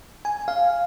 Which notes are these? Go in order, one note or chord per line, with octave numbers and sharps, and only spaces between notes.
G#5
F5